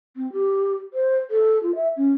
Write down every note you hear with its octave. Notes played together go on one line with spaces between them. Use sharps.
C4
G4
C5
A4
F4
E5
C#4